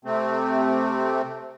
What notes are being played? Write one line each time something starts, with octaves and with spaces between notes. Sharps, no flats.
C3 A3 C4